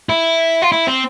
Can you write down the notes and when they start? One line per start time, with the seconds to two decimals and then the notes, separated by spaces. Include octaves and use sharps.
0.09 E4
0.62 F4
0.72 E4
0.87 C4